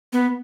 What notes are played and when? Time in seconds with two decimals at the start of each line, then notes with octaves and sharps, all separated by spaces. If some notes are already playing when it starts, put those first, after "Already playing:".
0.13 B3